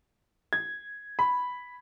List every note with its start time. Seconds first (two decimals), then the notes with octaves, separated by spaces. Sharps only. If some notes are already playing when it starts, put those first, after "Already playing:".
0.53 G#6
1.19 B5